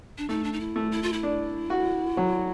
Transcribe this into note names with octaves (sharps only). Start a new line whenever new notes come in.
D4
A3 D#4
D4
D#4
E4
A3
E4
F4
E4
D4
F#4
F#3